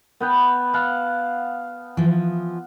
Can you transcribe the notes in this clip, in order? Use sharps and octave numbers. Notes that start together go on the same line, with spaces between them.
B3 B4 G5
F5 F#5 A5
E3 F3